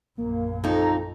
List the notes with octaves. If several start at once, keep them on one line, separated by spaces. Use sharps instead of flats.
A#1 F#2 A#3
F2 D#4 A4 A#5